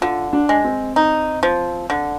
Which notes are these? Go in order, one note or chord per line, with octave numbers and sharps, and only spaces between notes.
D3 F4
D4
G#3
C4
D#4
F3
D3